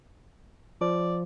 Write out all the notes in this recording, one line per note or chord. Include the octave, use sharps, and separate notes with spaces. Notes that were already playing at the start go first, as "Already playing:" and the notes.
F3 D5